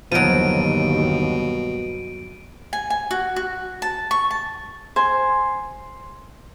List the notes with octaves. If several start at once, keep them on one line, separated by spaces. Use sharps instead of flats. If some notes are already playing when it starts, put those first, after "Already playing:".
G1 D#2 B2 F3 F#3 D7 D#7
G#5
G#5
F#4
F#4
A5
C#6
A5
C5 G#5